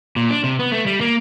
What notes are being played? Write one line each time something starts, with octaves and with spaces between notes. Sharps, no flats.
A#2
D4
C3
B3
A3
G3
A#3